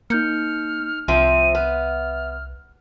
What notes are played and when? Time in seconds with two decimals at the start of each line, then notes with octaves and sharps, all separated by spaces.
0.10 A#3 D#4 F6 G6 C#7
1.08 C2 F3 C4 E5 D#7
1.55 B3 F6